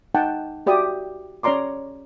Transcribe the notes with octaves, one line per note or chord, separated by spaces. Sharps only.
D#4 F#5 G5 A5
F#4 G4 D5 E5 D#6
C#4 C#5 D5 A#5 C6 D6